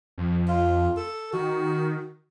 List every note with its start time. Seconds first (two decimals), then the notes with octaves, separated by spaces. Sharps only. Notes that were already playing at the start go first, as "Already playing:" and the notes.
0.18 F2
0.48 F4
0.97 A4
1.33 D#3 F#4